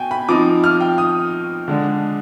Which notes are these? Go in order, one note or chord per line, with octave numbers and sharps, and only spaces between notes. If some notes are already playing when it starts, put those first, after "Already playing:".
Already playing: B2 G5 G#5
B5
F3 C4 D#4 D6
F6
G5
D#6
D3 G#3 D4